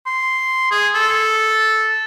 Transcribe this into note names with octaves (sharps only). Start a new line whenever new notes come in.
C6
G#4
A4